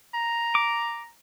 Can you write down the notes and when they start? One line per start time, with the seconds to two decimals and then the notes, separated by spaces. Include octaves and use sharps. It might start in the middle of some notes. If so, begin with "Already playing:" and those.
0.14 A#5
0.55 D6